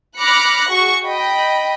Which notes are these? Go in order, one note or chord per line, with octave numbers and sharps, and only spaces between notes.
B5 D6 F6 F#6 A#6 C#7
F#4 G#4 C#6
D#5 G5 B5